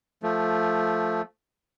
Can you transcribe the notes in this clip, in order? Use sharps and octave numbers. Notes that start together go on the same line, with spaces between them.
F3 A3